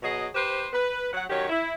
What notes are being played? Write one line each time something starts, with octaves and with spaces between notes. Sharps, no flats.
B2 F#3 G#4 D#5
G4 B4 C5
B4
F#3 F#5
D#3 F#3 C#4 G4 C#5
E4